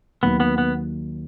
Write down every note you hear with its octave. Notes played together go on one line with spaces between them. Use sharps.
D#2 D#3 F#3 A#3 B3
B3
B3